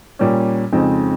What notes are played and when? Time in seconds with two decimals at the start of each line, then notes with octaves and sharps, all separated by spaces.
0.19 A#2 G3 C#4
0.72 F2 C#3 G#3 C4 D#4